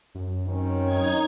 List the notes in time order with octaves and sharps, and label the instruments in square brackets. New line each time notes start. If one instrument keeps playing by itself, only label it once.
[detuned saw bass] F#2
[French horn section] D#3 C4 C#4
[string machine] D#4 G#6